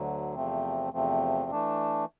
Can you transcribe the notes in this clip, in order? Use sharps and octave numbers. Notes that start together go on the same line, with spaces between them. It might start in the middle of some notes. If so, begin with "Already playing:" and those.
Already playing: D2 D3 F#3
E2 C3 F3 A3 C4
E2 C3 F3 A3 C4
E3 A3 D4